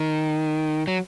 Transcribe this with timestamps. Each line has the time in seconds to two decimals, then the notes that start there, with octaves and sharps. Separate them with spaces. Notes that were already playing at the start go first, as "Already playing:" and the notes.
Already playing: D#3
0.88 F#3